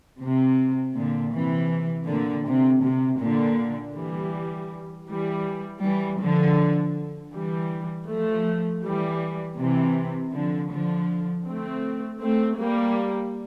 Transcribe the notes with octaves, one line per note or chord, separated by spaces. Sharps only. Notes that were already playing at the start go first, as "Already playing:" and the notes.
C3
A#2 D3
C3 E3
A#2 D3
C3
C3
A#2 D3
E3 G3
E3 G3
E3 G3
D3 F3
E3 G3
F3 A3
E3 G3
C3 E3
D3 F3
D3 F3
A3 C4
A3 C4
G3 A#3